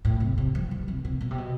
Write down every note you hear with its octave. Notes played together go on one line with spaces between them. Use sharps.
A2
C3
C3
F3
E3
C3
C3
B2
C3
B2